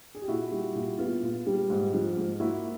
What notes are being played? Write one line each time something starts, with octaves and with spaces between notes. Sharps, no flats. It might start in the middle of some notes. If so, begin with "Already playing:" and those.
G#4
G4
A#2 E4 F#4
G3
A#2
B3 F4
A#2
G3
G#2
F3
G#2
A#3 E4 F#4